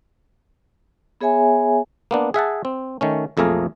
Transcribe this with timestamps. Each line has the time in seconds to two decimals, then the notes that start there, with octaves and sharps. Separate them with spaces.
1.21 B3 G#4 C#5 E5 G#5
2.11 A#3 B3 D4
2.34 G#4 E5 F#5 A5
2.65 C4
3.01 D#3 A3 C#4
3.37 B1 F2 A3 A#3 G#4 A#4